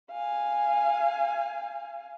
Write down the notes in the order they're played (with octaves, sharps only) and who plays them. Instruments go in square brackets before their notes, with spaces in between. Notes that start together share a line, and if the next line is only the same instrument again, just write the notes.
[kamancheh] F5 G#5